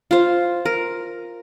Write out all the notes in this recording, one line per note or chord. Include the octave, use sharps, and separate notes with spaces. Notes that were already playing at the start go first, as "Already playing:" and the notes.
F4 C5
A#4